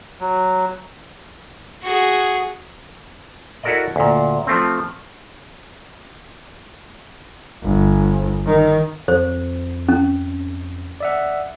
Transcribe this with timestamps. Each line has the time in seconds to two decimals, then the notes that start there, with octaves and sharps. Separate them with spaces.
0.20 F#3
1.83 F#4 G#4
3.63 E4 F#4 A4 A#4 D5 D#5
3.96 D2 A#2
4.47 F3 A3 C4
7.63 G1
8.46 D#3
9.08 F2 C5
9.89 C#4
11.00 D5 E5 F#5